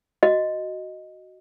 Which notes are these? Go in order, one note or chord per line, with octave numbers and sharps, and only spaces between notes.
F#4 D#5